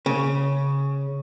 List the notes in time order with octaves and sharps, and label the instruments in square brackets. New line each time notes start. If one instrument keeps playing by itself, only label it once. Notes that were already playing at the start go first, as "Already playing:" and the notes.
[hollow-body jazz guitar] C#3